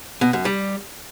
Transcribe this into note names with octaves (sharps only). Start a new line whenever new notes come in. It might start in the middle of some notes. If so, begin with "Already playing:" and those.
B2
F#2
G3